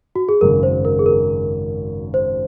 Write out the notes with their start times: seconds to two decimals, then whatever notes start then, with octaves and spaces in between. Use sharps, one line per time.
0.16 F#4
0.29 G#4
0.41 G#1 F#2 C#3 A#4
0.63 C5
0.85 A#4
0.99 G#4
1.06 A#4
2.14 C5